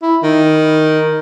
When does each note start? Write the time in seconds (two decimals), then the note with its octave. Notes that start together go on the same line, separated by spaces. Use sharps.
0.03 E4
0.23 D#3